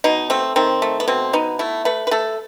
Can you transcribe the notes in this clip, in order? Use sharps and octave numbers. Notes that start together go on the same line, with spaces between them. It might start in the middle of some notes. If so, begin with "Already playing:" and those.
B2 D#4
A3 C4
D#3 C4
A3
B3
B2 C4
B3 D#4
A3 E4
A3 B4
B4
A3 A4